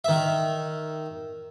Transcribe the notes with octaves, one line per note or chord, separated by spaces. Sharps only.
D#3 E5